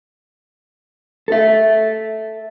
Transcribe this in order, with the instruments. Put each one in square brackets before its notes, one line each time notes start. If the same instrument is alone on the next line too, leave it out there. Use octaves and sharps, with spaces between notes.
[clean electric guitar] A4 E5